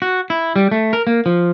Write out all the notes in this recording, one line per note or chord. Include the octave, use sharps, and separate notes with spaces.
F#4
E4
G3
A3
A#4
A#3
F3